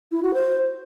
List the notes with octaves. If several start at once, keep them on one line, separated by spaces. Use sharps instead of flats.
E4
F#4
C5